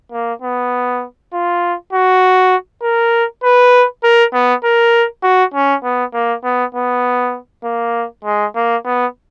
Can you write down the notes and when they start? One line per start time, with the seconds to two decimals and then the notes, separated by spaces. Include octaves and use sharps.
0.12 A#3
0.42 B3
1.33 F4
1.93 F#4
2.83 A#4
3.44 B4
4.03 A#4
4.33 B3
4.64 A#4
5.23 F#4
5.54 C#4
5.84 B3
6.14 A#3
6.44 B3
6.75 B3
7.64 A#3
8.25 G#3
8.56 A#3
8.85 B3